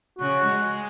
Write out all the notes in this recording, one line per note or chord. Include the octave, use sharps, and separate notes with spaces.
C#3 F#4
G#3